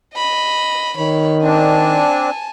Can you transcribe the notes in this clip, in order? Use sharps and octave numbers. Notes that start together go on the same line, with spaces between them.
D#5 B5
D#3 C#5 B5
C4 D4 G#5 A5